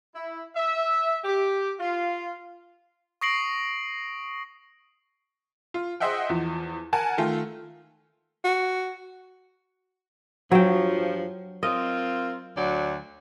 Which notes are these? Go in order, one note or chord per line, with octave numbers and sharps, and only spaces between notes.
E4
E5
G4
F4
C#6 D#6 A#6 C7 D7 F#7
F4
G#4 C5 D#5 E5 F#5 G5
E2 F3
A#4 F#5 G#5 A5
D#3 A3 F4
F#4
G2 F3 F#3 G5
C4 F4 A#4 D#5
D2 F#3 D5